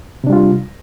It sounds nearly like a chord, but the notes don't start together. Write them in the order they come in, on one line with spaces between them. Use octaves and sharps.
C3 D4 G3 F4